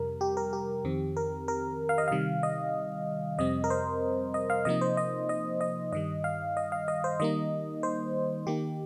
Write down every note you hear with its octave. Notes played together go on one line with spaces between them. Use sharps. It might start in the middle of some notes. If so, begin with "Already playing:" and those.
Already playing: F2 C3 G3 A#4
G4
A#4
G4
F2 D#3 C4
A#4
A#4
F5
D#5
C3 D#3 G3 F5
D#5
F2 C3 G3 C4 D#5
A#4
C5
D#5
F5
C3 F3 A#3 D#4 D#5
C5
D#5
D#5
D#5
G2 D#3 G3 D#5
F5
D#5
F5
D#5
C5
D#3 G3 A#3 D#4 D#5
C5
D#3 A#3 D#4 G4